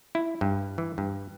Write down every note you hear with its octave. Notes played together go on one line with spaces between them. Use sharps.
E4
G2
E3
G2